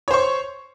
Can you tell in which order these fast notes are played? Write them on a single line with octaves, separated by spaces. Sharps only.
C#5 C5 C#6